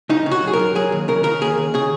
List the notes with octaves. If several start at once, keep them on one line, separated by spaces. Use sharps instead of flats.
C#3 D#4
C#3
F#4
F#2 G#4
A#4
F#2
F#3 G#4
D#2
C#3 A#4
C#3 A#4
D#2 G#4
D#2
C#3 G#4